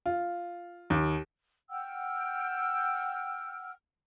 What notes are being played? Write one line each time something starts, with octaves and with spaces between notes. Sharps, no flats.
F4
D#2
F#5 G5 E6 F6